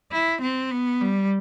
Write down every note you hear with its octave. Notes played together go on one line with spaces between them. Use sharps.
E4
C4
B3
G3